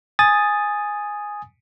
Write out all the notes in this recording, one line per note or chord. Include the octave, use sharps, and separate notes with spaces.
G#5 D#6 A6